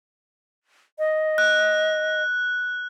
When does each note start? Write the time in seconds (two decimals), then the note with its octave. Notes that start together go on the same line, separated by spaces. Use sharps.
0.99 D#5
1.38 F#6